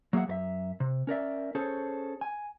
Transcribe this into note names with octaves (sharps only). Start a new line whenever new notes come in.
F#3 A#3 G#4 E5 F#5
F#2 A#4 E5
C3
C#4 A#4 D5 E5
C#4 G#4 A4 C5 C#5
G#5